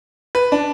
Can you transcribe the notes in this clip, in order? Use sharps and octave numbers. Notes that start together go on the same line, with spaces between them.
B4
D4